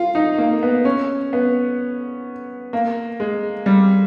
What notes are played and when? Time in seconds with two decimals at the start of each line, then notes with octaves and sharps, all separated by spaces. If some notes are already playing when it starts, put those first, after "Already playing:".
Already playing: F4
0.15 D#4
0.38 A#3
0.63 B3
0.85 C#4
1.33 B3
2.73 A#3
3.20 G#3
3.66 G3